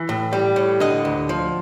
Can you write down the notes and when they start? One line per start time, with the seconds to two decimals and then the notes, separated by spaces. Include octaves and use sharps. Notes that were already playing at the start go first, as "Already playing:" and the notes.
Already playing: E3
0.09 A2
0.33 G3
0.56 A2
0.80 D3 D#5
1.05 D2
1.29 F3